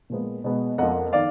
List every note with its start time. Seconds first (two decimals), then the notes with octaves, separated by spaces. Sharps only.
0.10 A#2 F3 G#3 B3
0.44 B2 G#3 B3
0.78 F2 F3 A#3 D#5 F#5
1.13 D#3 D5 F5